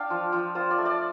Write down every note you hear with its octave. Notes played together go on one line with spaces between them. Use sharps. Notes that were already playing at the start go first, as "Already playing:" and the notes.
Already playing: D4 F5 G5
F3
F3
F4 C5
D5
A3
D5